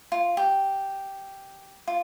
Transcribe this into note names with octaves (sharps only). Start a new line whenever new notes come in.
F4
G4
F4